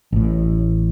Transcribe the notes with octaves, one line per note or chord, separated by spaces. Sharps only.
A1 A2